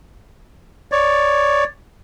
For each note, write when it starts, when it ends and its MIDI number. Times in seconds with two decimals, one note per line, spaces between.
0.92 1.64 73
0.92 1.64 74